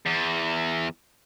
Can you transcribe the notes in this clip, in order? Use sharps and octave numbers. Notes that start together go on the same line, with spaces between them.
E2